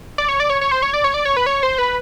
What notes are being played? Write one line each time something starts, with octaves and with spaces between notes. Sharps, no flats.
D5
C#5
D5
C#5
C#5
C5
C#5
D5
C#5
D5
C#5
B4
C#5
C5
B4